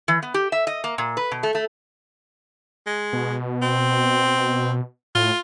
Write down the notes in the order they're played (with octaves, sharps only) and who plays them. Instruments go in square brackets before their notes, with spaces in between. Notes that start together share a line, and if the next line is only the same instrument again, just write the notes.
[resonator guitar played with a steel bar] E3
B3
G4
E5
D#5
A#3
A#2
B4
B2
A3
A3
[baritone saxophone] G#3
[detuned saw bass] B2
[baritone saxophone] C4
[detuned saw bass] A2 [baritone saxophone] F4